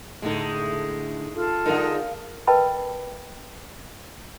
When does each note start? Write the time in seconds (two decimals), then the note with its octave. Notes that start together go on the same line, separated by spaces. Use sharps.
0.22 A2 D3 G#3 A3 D#4
1.33 F4 A4 A5
1.66 D3 G#3 D#4 A#4 F5
2.47 A#4 B4 D#5 G5 A5 B5